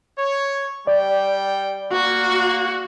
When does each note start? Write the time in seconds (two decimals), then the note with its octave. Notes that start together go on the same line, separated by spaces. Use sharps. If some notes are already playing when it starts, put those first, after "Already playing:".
0.17 C#5
0.87 G3 D5 G5
1.93 A#3 F#4